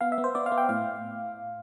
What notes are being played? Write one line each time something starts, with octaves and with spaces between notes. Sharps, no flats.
B3 F5
E5
B3
C5
B3 D5
F5
B3
G5
A2 F5